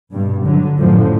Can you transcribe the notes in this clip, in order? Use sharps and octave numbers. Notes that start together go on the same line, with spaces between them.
G2 B2
D3 F#3
F#2 A2 D3 F3